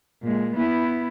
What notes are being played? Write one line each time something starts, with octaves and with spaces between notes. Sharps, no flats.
A#2 G#3
B3 E4